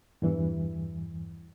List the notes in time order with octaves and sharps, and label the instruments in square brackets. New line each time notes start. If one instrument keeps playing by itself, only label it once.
[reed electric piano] E2 G2 E3